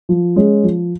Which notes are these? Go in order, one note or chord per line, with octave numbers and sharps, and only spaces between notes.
F3
G#3 C#4
F3